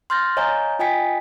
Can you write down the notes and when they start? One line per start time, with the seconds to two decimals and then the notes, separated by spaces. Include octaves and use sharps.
0.10 C6 F6 G6 A6 A#6
0.37 C#5 D#5 F5 G#5 A#5 G6
0.79 F4 D#5 G5 G#5 B6